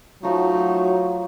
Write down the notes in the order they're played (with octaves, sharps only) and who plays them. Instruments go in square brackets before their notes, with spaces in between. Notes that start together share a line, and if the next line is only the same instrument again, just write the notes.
[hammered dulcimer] F3 F4 [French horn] F#3 [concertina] A3 D#4 F#4